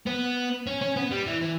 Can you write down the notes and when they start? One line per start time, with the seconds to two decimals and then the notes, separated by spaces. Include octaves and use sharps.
0.07 B3
0.67 C#4
0.81 C#4
0.96 B3
1.11 G3
1.27 E3
1.41 E3